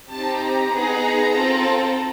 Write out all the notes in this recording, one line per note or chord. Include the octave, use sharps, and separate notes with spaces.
C4 D#4 G4 A5
A#5
B3 D#4 G#4
C4 F4 A4